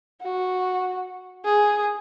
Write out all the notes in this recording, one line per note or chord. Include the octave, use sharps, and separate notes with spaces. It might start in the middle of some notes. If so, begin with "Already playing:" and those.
F#4
G#4